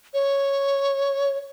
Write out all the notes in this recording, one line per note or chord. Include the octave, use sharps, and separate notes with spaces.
C#5